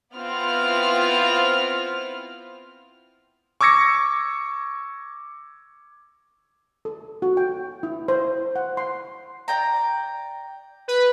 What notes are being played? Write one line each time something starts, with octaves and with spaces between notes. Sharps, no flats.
B3 C4 E4 F4 F6
C#6 D6 E6 G#6 A#6 C#7
A4
F#4
G5
E4
C5
F#5
C6
D5 G5 A#5
B4